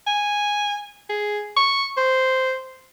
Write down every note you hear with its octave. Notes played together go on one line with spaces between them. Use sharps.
G#5
G#4
C#6
C5